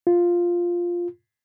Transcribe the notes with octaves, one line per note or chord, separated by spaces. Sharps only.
F4